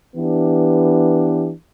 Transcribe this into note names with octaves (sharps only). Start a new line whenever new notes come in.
E3 B3 D4 G4